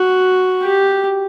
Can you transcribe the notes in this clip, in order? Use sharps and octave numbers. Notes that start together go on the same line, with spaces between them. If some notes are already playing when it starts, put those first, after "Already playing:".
Already playing: F#4
G4